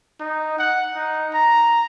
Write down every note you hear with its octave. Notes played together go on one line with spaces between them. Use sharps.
D#4
F#5
D#4
A#5